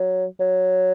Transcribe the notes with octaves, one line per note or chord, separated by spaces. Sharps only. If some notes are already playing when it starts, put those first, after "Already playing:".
Already playing: F#3
F#3